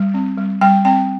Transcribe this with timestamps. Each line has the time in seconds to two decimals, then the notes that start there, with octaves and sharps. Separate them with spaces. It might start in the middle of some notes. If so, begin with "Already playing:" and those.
Already playing: G3
0.14 C4
0.37 G3
0.61 G3 G5
0.85 C4 G5